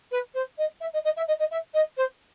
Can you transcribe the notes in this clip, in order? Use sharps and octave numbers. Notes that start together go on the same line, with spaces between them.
B4
C5
D#5
E5
D#5
D#5
E5
D#5
D#5
E5
D#5
C5